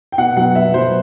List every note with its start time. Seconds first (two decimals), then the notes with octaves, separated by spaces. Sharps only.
0.12 G5
0.18 B2 F#5
0.37 F#3 B3 F#5
0.55 B2 E5
0.74 F#3 B3 C5